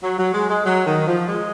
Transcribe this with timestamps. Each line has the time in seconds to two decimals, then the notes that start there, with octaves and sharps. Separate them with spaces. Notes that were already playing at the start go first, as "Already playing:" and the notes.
0.03 F#3
0.19 F#3
0.34 G#3
0.50 G#3
0.66 F#3
0.86 D#3
1.07 F3
1.28 G#3